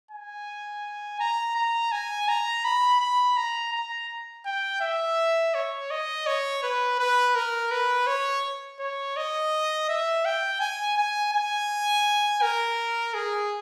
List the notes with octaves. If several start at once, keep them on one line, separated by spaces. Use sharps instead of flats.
G#5
A#5
A#5
G#5
A#5
B5
B5
A#5
A#5
G5
E5
C#5
D#5
C#5
B4
B4
A#4
B4
C#5
C#5
D#5
E5
G5
G#5
G#5
G#5
A#4
G#4